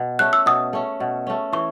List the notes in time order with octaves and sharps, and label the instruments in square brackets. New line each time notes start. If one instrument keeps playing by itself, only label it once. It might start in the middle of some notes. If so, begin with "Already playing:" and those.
Already playing: [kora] B2
[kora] A3 C#4 [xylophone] F#6
[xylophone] E6
[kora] B2 [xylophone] D#6
[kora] A3 C#4
B2
A3 C#4
[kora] E3 [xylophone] C#6